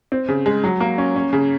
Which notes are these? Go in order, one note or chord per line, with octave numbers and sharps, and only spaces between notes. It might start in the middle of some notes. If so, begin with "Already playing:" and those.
C4
C#3
G#3
F#3
A#3
C#4
C#4
C#3